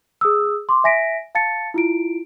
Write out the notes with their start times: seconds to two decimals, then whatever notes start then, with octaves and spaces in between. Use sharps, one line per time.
0.21 G#4 D#6 E6
0.69 C6 D6
0.84 E5 G#5 A#6 B6 D7
1.35 F5 A5 A6 C#7
1.74 E4 F4 D7